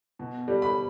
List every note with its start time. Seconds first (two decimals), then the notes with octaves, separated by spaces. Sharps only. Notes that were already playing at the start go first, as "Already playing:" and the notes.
0.19 B2
0.48 G3
0.62 B5